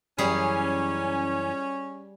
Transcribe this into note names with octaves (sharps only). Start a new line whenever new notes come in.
F#2 E3 G3 C#4 G#4